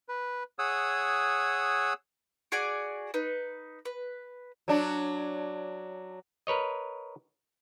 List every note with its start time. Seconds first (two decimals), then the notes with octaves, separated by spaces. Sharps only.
0.09 B4
0.59 G#4 C#5 F#5 D#6 E6
2.52 F#4 G#4 D5 G#5
3.14 D#4 B4
3.85 B4
4.68 F#3 D4
6.47 A#4 B4 C#5 D#5